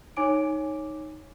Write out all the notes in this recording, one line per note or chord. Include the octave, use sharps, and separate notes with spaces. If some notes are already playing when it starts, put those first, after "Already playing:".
D#4 C#5 G#5 D6 D7